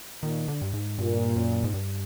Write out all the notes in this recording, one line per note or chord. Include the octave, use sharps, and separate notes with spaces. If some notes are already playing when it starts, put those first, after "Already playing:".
A#2 D#3
D3
G2
G#2
G2 A#2
F#2
G#2
G2